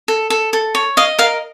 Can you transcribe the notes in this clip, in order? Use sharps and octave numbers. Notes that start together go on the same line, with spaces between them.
A4
A4
A4
C#5
D#5 F5
A#4 F5